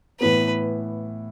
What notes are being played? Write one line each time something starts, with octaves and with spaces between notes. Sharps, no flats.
A2 E3 B3 B4